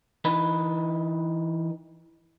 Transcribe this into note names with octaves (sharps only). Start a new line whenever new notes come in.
E3 D#4 B4